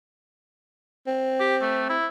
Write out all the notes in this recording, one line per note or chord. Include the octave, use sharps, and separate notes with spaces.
C4
G4
A3
E4